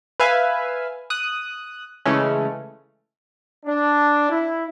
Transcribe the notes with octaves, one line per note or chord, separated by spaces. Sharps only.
B4 E5 F5 G#5
D#6 F#6
C#3 E3 G#3 A3 C#4
D4
E4